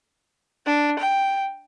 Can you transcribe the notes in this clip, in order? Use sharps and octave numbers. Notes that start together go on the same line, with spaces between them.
D4
G5